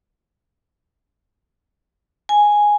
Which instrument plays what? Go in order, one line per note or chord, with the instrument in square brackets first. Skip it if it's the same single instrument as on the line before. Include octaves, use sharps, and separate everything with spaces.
[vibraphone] G#5